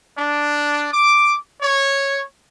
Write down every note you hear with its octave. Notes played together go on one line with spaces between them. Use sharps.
D4
D6
C#5